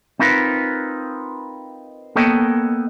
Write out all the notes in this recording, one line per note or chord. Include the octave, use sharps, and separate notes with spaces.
C4 D#4 F4 A#4 B4
A#3 B3 A4 C#5 D#5 G5